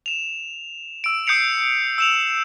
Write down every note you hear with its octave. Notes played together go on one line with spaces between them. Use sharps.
E7 F7
E6 D7
D#6 G6 C7 C#7 F7
E6 E7 F7